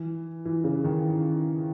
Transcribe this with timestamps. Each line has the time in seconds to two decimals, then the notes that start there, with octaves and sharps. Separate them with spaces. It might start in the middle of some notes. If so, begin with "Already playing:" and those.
Already playing: E3
0.45 E3
0.64 C#3
0.84 D#3